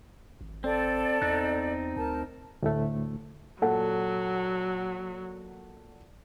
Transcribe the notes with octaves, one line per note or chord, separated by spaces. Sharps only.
G#1
C4 A4 D5
E2 C4 D#4 F#6
D2 A#4 A5
D2 A2 A3
A#2 F#3 A4 F#5